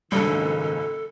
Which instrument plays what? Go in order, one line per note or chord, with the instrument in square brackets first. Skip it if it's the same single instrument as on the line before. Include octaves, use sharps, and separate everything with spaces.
[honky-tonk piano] F#1 C#2 [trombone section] G#2 D#3 [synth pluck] G3 D4 [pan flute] A4